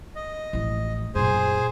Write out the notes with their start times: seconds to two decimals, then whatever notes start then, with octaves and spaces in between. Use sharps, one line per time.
0.16 D#5
0.53 A1 F3
1.15 F#2 A#2 G#4 C5 G#5